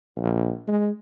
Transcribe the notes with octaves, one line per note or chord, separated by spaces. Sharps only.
A#1
G#3